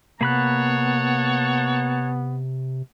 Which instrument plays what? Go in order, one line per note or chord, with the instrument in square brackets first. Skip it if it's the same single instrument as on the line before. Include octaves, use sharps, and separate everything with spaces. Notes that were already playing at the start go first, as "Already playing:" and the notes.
[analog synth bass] C3 [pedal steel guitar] A#3 B5 F#6 [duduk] B3 [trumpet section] C#5 F#5 A5